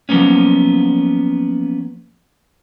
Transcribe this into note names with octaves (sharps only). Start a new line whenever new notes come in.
F3 F#3 A#3 B3 C#4